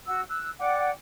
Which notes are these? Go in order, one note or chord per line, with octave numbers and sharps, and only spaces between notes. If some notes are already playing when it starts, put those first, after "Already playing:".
F#4 E6
E6 F#6
D5 F#5 G5 D6